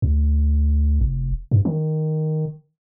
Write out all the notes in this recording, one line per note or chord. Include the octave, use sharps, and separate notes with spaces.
D2
F1
G2
D#3